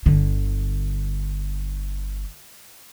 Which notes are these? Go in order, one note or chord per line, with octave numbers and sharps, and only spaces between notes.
G1 D3